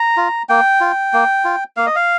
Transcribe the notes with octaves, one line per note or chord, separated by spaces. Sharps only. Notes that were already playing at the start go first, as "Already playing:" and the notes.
Already playing: A#5
F4
A#3 G5
F4
A#3
F4
A#3 F5
D#5
F5